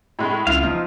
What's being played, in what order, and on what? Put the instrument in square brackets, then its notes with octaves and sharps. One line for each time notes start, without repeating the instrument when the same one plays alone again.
[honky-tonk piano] A2 G#3
[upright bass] C#2 [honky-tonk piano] E4 F4 [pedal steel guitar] F5
[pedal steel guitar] F3 D#4 [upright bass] B3